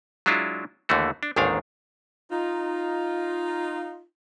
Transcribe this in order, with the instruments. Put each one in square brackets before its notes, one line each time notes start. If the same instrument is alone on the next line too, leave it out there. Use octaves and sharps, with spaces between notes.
[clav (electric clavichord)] F#3 G#3 D4 E4 F4
D#2 D3 E3 A3 F#4
D4
A1 D#2 G#2 D#3 D4 F5
[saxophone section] D#4 F4